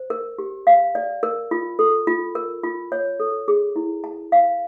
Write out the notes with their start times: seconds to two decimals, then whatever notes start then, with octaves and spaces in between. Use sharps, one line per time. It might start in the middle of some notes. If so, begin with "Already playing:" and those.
Already playing: C5
0.10 A#4
0.39 G4
0.67 F5
0.95 D5
1.23 A#4
1.51 F4
1.79 A4
2.07 F4
2.35 A#4
2.63 F4
2.92 C#5
3.20 A4
3.48 G#4
3.76 E4
4.04 A5
4.32 F5